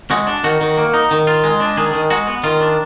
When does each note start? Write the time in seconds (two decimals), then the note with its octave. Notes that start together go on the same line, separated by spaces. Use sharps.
0.11 G#3 F#4
0.27 D4
0.44 D#3 F#4
0.61 D#3
0.77 A#3
0.94 D#4
1.11 D#3
1.27 F4
1.44 G#3
1.60 D4
1.77 D#3 G#4
1.94 D#3
2.10 G#3 F#4
2.27 B3
2.44 D#3 F4
2.61 D4